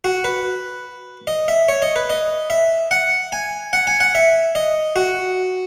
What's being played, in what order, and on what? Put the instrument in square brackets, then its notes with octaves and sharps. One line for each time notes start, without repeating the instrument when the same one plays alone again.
[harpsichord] F#4
B4
D#5
E5
C#5
D#5
B4
D#5
E5
F#5
G#5
F#5
G#5
F#5
E5
D#5
F#4